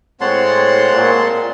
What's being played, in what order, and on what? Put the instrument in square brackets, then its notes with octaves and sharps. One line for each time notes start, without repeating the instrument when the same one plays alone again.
[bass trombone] A2 [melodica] G#3 A5 C6 [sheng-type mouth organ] C4 C#5 F#5
[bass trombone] A#2